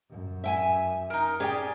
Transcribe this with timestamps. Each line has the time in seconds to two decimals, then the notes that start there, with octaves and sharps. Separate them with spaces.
0.11 F#2
0.44 E5 G5 G#5
1.10 D#4 A#4
1.40 C#4 G4 G#4 D5 G5